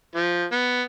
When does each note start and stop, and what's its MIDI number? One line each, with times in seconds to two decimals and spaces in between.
0.15 0.45 53
0.52 0.82 59